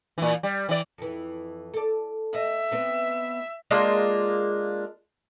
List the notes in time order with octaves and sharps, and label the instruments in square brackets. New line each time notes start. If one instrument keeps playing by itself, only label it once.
[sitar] A#2 E3
G3
E3 D5
[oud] F2 E3
A4 D5
[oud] D#5 [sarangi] E5
[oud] B3 C4 D#4
[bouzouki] G#3 A#3 D4 F4